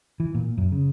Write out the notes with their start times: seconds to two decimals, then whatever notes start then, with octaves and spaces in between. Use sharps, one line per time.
0.20 E3
0.35 A#2
0.58 F#2
0.72 C#3